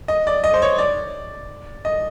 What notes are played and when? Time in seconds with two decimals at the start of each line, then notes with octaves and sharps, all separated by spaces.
0.08 D#5
0.27 D5
0.44 D#5
0.54 C5
0.62 C#5
0.78 D5
1.85 D#5